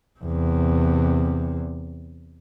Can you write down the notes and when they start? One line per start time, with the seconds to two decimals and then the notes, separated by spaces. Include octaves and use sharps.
0.20 E2 C3